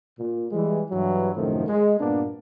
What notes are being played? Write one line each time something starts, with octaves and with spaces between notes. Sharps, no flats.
A#2
E3 G3 G#3
G2 E3 F#3
F#2 A2 C3 D#3 F3 A3
G#3
G2 A#2 A#3 B3 D4